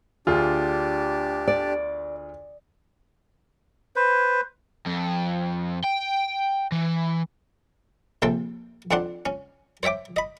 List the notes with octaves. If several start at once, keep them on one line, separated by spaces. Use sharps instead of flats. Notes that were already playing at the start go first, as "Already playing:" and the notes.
D2 D4 F4 G4 G#4
D5
B4 C5
F2
G5
E3
A#1 C3 A4 G5 C6
F2 C4 D4 F#5 C6
C#4
C5 C#5 E5 G5 D6
D#5 B5